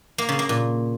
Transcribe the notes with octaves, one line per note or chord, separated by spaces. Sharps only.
A#3
C#3
A#3
A#2